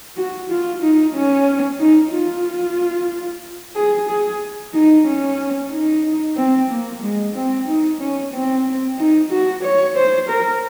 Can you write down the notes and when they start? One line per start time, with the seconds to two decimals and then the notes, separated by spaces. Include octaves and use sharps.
0.17 F#4
0.49 F4
0.82 D#4
1.14 C#4
1.79 D#4
2.12 F4
3.76 G#4
4.08 G#4
4.74 D#4
5.06 C#4
5.71 D#4
6.36 C4
6.69 A#3
7.02 G#3
7.34 C4
7.68 D#4
8.00 C#4
8.32 C4
8.98 D#4
9.30 F#4
9.63 C#5
9.96 C5
10.28 A#4